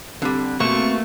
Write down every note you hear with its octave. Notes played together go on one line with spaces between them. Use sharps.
D3 G3 C4
B2 A3 A#3 C#6